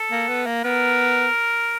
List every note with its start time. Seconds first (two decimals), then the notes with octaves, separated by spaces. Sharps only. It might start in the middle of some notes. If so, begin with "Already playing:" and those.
Already playing: A4
0.11 A#3
0.28 B3
0.46 A#3
0.64 B3 A#4